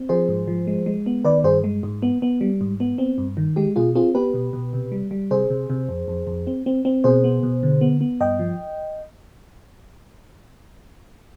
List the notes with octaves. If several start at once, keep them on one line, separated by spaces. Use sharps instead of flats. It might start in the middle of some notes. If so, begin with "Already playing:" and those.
Already playing: C4
F3 G#4 C5
G#2
F3
G#3
G#3
B3
D#3 B4 D5
G2 G#4 C5
G#3
G#2
B3
B3
G3
G#2
B3
C4
G2
D#3
G#3 G4
B2 F4 G#4
C4 F4 G#4
B3 G4 B4
B2
B2
C3
G3
G3
C3 G#4 C5
C3
C3
F2
F2
F2
C4
C4
C4
B2 G#4 C5
B3
B2
D3
B3
B3
G2 D#5 G5
F3